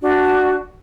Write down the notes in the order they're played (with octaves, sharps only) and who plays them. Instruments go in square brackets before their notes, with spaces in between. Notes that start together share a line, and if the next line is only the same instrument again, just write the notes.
[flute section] D4 F#4